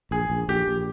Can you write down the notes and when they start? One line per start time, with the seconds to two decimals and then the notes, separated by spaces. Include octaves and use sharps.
0.11 A#1 G#4
0.30 A#1
0.49 A#1 G4
0.67 A#1